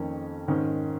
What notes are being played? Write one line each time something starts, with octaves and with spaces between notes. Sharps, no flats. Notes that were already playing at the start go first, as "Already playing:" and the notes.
Already playing: F2 D#3 A#3 C#4
G#2 D#3 C#4